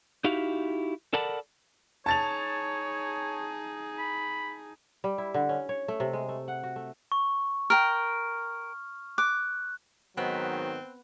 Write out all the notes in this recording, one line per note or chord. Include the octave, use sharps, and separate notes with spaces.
D#4 E4 F#4 G4 F5
A4 A#4 D5 F#5 A5 B5
D#4 G#4 C#5 A5 A6 F7
B5
G3
E4
D3
C#4
C#5
A3
C3
G#3
A3
F#5
F#4
A3
C#6
A#4 G5 F6
D6 F#6
G#2 D#3 F#3 B3 C4